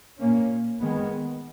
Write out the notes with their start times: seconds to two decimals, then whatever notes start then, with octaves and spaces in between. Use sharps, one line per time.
0.18 A#2 A#3 C#4
0.80 D#3 G#3 B3